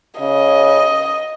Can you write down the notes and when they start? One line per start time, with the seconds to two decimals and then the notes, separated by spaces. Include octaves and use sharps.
0.20 C#3 D#5